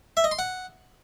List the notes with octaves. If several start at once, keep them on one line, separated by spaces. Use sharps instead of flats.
E5
D#5
C6
F#5